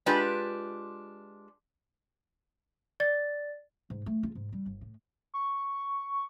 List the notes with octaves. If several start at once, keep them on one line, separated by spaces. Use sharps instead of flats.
G#3 D4 F4 G4 B4
D5 A6
G#2
A3
F4
G#2
G3
G1
A2
C#6